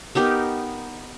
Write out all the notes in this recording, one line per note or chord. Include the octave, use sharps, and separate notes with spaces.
B3 D#4 G4 A#4